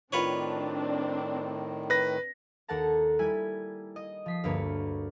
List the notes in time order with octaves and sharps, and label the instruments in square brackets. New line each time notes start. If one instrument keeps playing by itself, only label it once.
[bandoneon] A2 D#3 [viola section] C4 D4 [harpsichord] F4 B4 C#5
[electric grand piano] B4 A#6
[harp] D#2 A#3 A4 F#5 A5 A#5
G3 E4 G#5 D#7
D#5
F3 B6 C7
D2 G2 A#3 B4 C#5